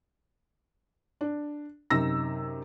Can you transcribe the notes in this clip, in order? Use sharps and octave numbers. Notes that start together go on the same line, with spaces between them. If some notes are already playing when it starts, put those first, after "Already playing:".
D4
F#2 C3 D#4 E6 A#6